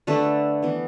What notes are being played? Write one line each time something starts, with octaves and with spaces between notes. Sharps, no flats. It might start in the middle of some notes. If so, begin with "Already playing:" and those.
D3 A3 B4
E3 B3